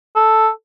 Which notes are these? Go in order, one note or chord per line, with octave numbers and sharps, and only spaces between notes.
A4